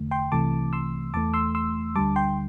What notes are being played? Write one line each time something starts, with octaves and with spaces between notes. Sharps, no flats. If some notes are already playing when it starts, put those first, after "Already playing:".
Already playing: E2 D3 A3
G5 C6
C2 C3 E3 A3 A5 D6
C6 E6
E2 E3 A3 A5 D6
C6 E6
C6 E6
D2 D3 G3 A5 D6
G5 C6